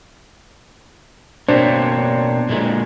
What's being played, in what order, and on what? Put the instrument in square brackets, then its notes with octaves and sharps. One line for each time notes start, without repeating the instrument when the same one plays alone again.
[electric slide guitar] B2 A#3 C4 [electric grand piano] D4 C5 C#5
[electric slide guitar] A#2 D3 G#3